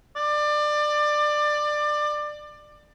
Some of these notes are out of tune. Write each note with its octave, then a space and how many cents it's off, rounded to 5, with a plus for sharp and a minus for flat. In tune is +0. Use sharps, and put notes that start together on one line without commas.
D5 +25